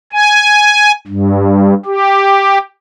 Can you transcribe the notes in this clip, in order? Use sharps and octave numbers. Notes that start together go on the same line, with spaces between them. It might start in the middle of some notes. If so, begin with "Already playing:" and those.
G#5
G2
G4